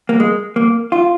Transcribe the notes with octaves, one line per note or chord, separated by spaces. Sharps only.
A#3
G#3
A#3
F4